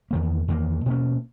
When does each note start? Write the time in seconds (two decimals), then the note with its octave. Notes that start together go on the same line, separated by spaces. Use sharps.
0.11 E2 D#3 A#3
0.48 E2 D#3 A#3
0.86 B2 A#3 C#4